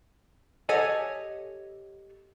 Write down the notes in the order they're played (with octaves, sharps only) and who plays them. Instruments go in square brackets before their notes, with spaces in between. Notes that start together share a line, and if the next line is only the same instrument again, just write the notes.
[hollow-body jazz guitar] G4 A4 C#5 D#5 F#5 G#5